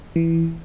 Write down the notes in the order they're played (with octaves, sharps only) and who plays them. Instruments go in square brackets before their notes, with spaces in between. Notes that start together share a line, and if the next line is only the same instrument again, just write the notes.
[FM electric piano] E3